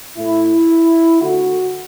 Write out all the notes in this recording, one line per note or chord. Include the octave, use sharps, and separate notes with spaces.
A2 A3 E4
D3 A3 F#4